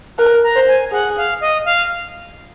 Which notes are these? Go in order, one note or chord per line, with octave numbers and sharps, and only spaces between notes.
A#4 F#6
A#5
C5
G#5
G#4 F#5
F5
D#5
F5